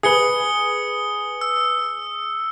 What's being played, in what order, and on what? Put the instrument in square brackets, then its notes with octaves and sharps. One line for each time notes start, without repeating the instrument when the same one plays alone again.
[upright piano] G#4 B4 [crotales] D#6 C#7 G7
[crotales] E6